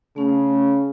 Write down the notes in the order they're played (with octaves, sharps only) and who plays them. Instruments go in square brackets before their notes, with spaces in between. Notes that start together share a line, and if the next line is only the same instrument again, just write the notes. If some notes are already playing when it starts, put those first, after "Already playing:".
[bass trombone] C#3 [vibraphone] A3 C#4